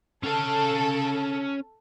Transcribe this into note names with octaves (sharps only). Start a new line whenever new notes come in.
C#4 A4 F5